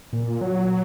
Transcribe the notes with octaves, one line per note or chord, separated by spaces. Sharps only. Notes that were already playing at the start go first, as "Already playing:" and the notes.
A#2
F#3